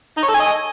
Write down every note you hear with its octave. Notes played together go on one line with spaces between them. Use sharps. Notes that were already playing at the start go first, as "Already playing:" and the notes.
D#4
C#5
A4
G#5
D#5